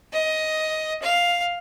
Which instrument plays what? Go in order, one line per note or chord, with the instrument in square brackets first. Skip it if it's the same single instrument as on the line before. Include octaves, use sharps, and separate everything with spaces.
[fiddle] D#5
F5